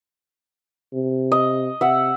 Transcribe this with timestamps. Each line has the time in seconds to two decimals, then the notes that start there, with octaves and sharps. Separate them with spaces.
0.93 C3
1.32 D#5
1.81 C3 E5 F#5